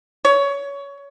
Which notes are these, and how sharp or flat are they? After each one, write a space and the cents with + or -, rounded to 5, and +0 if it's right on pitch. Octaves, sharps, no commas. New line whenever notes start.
C#5 +20